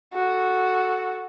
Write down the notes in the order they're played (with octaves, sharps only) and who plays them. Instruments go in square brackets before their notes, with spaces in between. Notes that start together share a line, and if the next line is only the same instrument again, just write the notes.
[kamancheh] F#4 A4